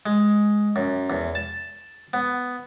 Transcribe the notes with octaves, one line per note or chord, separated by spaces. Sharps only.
G#3
F#2
E2
A5
B3